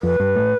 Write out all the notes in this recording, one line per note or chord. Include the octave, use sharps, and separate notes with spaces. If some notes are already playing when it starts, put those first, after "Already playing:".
F2 B4
G2
A2